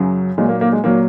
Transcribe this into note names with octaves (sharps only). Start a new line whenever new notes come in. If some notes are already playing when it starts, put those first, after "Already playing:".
Already playing: F#2 C#3 F#3
A#2 F#3 G#3
A#3
A#3
G#3
A#2 F#3 A#3